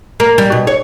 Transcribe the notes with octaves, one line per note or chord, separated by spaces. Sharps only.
A#3
G3
B2
C#5